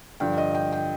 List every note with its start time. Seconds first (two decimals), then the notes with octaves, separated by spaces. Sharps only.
0.20 G2 D3 F3 G5
0.38 D#5
0.55 G5
0.72 G5